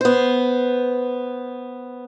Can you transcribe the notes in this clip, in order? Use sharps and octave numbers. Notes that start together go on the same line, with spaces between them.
B3 C5